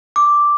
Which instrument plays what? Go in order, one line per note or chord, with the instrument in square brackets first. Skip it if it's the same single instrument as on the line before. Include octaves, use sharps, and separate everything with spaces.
[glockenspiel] D6